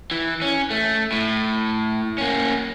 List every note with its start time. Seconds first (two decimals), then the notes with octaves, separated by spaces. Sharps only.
0.11 E3
0.42 C#4
0.70 A3
1.12 A2
2.18 A#3 C#4